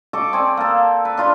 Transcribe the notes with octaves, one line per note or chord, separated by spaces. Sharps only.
A4 D#5 C#6 D6
C4 G#4 D5
A#3 A4
B4
D4 F4 F5 C6